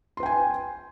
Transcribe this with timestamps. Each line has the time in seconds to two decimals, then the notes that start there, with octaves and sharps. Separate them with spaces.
0.17 C6
0.20 B4
0.23 G5
0.26 G#5